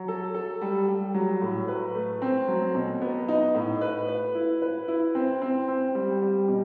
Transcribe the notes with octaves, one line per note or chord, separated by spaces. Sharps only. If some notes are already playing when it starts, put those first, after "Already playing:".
Already playing: F#3
A4
A4
G3
G3
F#3
A2
B4
A3
C4
F#3
B2
B3
D#4
A2
B4
B4
E4
B4
E4
C4
C4
C4
G3
G3
B2